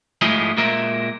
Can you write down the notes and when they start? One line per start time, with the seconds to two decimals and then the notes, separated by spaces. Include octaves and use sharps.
0.22 G#2 F3 G#3 A3 E4 G#4
0.58 A#2 G#3 A#4 E5